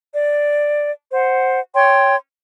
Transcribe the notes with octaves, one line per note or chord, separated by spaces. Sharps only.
D5
C5 F#5
C#5 G5 C6